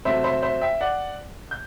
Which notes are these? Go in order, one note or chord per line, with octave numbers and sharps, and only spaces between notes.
C3 F#3 A3 C5 E5
C5 E5
C5 E5
E5 G5
D5 F#5
G6